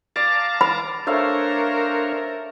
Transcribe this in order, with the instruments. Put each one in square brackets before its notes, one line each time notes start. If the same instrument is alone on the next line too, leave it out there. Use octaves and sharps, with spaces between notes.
[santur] D5 [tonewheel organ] F5 A5 A#5
[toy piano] B5
[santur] A3 F5 [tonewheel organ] D4 C5 C#5 [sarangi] A#4